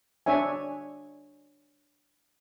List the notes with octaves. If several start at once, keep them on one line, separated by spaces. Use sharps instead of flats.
D4 C#5 E5 G#5